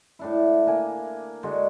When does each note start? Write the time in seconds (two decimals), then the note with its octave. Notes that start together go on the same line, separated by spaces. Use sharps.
0.19 A2 D4 E4
0.67 A#3 G#5 D6
1.43 D3 G#3 F#4